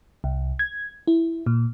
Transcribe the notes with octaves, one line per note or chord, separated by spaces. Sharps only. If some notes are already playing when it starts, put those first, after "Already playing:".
C2
G#6
E4
A#2